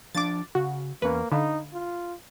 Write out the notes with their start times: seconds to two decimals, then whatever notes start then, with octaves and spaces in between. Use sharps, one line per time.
0.15 F3 D4 D6 A6
0.55 C#3 F#4
1.02 E2 A#3 C#4 B4
1.32 D3 D#4 F5 B5
1.73 F4